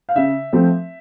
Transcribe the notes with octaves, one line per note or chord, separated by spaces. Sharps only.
F5
C#3 E5
F3 A3 C4